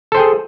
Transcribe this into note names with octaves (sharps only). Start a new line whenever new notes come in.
G#4 A4 C5 G5